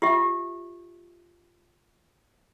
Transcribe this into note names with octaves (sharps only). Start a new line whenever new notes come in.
F4 G4 E5